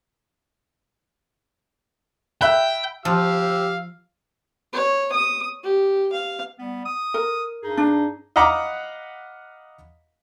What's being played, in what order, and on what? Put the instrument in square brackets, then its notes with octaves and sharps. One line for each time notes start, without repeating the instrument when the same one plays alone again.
[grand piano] E5 B5 F#6 [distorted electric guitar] G5
[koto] F3 [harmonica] G4 E6 [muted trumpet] F5
[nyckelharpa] C#5
D#6
G4
F5
[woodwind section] G3 B3
D#6
[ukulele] A#4
[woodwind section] G2 D#4 G#4
[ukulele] D4
[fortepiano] D#5 F5 F#5 A#5 B5 D6